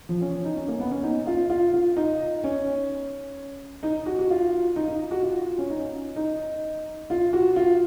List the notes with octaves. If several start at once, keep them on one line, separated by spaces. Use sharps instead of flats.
F3
C#4
D#4
C#4
A#3
B3
C#4
D#4
F4
F4
F4
D#4
C#4
D#4
F#4
F#4
F4
D#4
D#4
F#4
F4
C#4
D#4
D#4
F4
F#4
F4